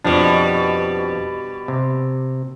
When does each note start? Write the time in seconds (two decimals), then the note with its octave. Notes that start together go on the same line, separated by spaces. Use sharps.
0.04 F2 B2 F3 G3 D4
1.68 C3